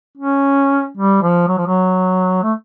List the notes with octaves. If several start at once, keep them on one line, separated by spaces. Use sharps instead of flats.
C#4
G3
F3
F#3
F3
F#3
A3